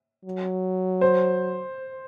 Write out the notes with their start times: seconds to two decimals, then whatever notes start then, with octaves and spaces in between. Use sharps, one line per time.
0.25 F#3
1.01 C5